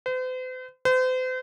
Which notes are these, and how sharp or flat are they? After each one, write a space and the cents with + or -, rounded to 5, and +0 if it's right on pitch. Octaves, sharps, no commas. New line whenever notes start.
C5 -45
C5 -40